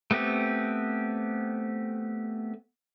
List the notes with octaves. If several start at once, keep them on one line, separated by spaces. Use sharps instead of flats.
A3 B3 C4 G4